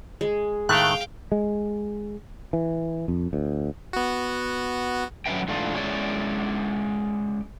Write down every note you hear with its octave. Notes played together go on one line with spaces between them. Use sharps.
G#3
A2 D#3 A3 F5 G5 F#6
G#3
E3
F2
D2
B3 F#4
F#3 C#4 B4 E5 G5
G#2 E3 A3 D4 F4
G#3 C#4 E4 D5